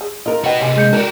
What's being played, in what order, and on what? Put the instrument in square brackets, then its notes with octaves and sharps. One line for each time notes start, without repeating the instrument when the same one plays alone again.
[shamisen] G#4
[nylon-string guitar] F4 A#4 [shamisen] D#5
[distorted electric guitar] B3 F#4 [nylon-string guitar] D#4 [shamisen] B4 G5
[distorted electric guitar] C3 A#3 [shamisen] G4 G#5
[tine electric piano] G#3 G6 C#7
[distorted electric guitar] F#4 G4 [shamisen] A4 D5 [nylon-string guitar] A#4